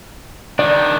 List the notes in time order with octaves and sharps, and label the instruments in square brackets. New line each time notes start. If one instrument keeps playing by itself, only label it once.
[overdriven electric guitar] D#3 D4 [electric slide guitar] D5